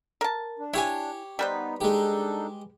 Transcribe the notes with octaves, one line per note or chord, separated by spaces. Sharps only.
A#4 A5
D4
E4 G4 C#5 G#5
G3 B3 D#4 B4 C5
G#3 D4 D#4 G4 A4